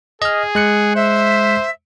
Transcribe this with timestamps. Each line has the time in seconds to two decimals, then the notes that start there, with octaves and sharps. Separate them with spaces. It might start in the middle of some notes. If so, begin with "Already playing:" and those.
0.22 G#4 D#5 F6
0.55 G#3 F#6 C#7
0.96 C5 E5